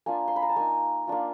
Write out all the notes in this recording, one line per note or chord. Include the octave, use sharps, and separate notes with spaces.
A#3 D4 F4 G#5
C6
B5
A#5
A5
A#3 D#4 G#5
A#3 D4 F4